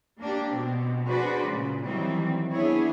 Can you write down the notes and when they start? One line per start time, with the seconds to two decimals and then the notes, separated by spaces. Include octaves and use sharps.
0.21 A#3 D4 G4
0.53 B2 C4
1.07 D4 F#4 G#4 B4 C5 D5
1.43 A#2 C#3
1.84 D#3 E3 F#3 G3 C4
2.54 B3 D4 E4 G#4 C#5